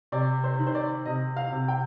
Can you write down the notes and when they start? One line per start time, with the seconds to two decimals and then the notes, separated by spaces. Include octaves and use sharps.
0.12 C3 D5
0.44 C5
0.59 D#3
0.67 C5
0.75 D5
1.06 C3 D#5
1.37 F5
1.52 C3
1.68 G5